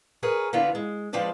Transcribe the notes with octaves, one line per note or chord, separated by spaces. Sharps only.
G#4 A#4 B4 C#5
D3 E3 B3 E4 F4 B4
G#3
F3 G#3 C4 B4 D5 A5